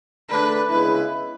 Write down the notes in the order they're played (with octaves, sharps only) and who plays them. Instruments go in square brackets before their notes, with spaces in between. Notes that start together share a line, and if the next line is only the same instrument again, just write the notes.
[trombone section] D3 A3 D4 [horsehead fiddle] B4
[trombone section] C#3 G#3 B3 E4 [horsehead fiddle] B4